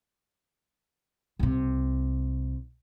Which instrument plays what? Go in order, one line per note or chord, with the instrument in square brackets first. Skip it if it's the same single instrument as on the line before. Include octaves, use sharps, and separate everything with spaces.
[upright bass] C2 C3